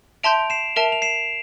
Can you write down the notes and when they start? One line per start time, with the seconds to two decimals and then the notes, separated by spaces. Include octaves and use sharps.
0.23 E5 A5 C6 G6 D7 F7
0.50 C7 E7
0.76 A#4 E5 A5 D7 F7
0.92 F7
1.02 C7 E7